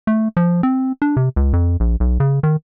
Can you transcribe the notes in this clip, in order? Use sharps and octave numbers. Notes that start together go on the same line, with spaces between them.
A3
F3
C4
D4
C3
C#2
F2
A#1
B1
C#3
D#3